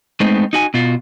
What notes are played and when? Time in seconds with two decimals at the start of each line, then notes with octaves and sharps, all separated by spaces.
0.20 G#3 A3 B3 C4 D#4
0.53 D#4 F#4 G#5
0.74 B2 F4 F#4